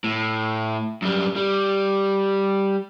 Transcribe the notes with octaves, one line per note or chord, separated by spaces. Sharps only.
A2
F#2 G3
G3